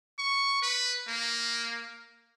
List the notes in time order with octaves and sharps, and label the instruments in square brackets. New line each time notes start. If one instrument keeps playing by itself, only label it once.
[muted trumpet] C#6
B4
A#3